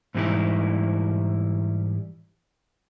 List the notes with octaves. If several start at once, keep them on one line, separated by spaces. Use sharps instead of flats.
G#2 E3 G3 C#4 D#4 E4